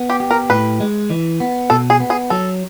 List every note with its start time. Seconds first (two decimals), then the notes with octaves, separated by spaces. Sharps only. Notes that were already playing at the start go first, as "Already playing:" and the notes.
Already playing: B3
0.10 G4
0.20 G4
0.31 A#4
0.50 A2 B4
0.80 G#3
1.10 E3
1.40 B3
1.70 B2 A4
1.90 G#4
2.00 B3
2.10 G#4
2.30 F#3 A4